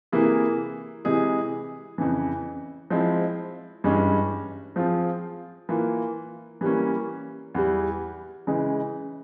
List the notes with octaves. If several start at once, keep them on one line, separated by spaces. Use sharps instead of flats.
C3 E3 A#3 E4 G#4
C3 E3 G#3 E4 G#4
F2 C#3 E3
F3 G#3 C4 E4
G2 E3 G#3 C#4
F3 C4 F4 G#4
E3 A#3 F4
E3 G3 A#3 C#4
E2 E3 G3
C#3 E3 G#3